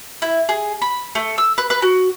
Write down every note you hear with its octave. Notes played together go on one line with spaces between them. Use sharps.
E4
G#4
B5
A3
E6
B4
B4
F#4